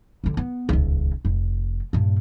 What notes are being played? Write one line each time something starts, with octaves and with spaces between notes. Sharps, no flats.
D#2 D3
B3
D#1 C#2
F1
G2 A#2